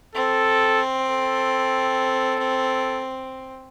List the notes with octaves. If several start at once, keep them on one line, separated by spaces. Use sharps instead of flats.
C4 A4
A4